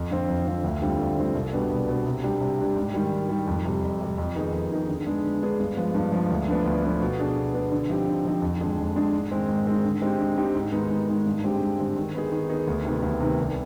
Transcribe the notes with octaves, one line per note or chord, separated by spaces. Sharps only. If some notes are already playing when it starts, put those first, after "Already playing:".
Already playing: F2
D3 F3 C4
F2
D3 F3 C4
D2
D3 G3 C4 F4
D2
D3 G3 C4 F4
C2
B2 G3 B3 D4
C2
B2 G3 B3 D4
C3
G3 D4 G4
C3
G3 D4 G4
G#2
D#3 G3
G#2
D#3 G3
F2
C3 G3
F2
C3 G3
F2
D#3 B3 D#4 G#4
F2
D#3 B3 D#4 G#4
D3
G#3 B3 D4 G#4
D3
G#3 B3 D4 G#4
G2
F3 G#3 B3
G2
F3 G#3 B3
D2
D3 F3 B3 D4
D2
D3 F3 B3 D4
B2
B3 D4 G#4
B2
B3 D4 G#4
D3
F3 C4 D#4 G4
D3
F3 C4 D#4 G4
F2
D3 G#3 D4 G#4
F2
D3 G#3 D4 G#4
G#2
D#3 G#3 C4
G#2
D#3 G#3 C4
D3
G#3 C4 D#4 G4
D3
G#3 C4 D#4 G4
G#2
D#3 G#3 B3 D#4
G#2
D#3 G#3 B3 D#4
G2
D3 G#3 C4 G4
G2
D3 G#3 C4 G4
D#3
B3 D#4 G#4
D#3
B3 D#4 G#4
D2
C3 D#3 B3
D2
C3 D#3 B3
C2